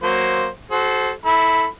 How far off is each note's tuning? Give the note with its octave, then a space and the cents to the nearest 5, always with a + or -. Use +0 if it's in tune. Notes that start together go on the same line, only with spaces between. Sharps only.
F#3 +0 A#3 +0 C5 +0
F#4 +20 A4 -30 C5 +0
E4 -20 A4 +0 B5 +0